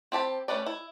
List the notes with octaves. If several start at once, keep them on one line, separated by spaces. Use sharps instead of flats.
C4 G4 A5 B5
G3 A3 C#4 B4 D5
E4